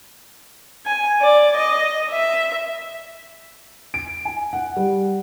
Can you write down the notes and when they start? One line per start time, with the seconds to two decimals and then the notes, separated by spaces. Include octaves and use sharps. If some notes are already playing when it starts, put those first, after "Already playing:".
0.85 G#5
1.22 D5
1.57 D#5
2.11 E5
3.94 D7
4.25 G#5
4.53 F#5
4.76 G3